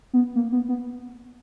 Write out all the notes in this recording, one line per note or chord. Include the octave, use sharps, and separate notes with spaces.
B3
A#3
B3
B3